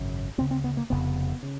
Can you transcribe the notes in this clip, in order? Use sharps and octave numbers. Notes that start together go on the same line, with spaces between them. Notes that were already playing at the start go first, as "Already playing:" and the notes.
Already playing: G#1 F#2 C#3
D2 C#3 C4
C4
B3
A#3
F1 F2 C#3 B3
C#3